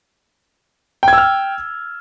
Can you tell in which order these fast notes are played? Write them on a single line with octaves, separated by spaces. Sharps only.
G5 G#6 E6 F6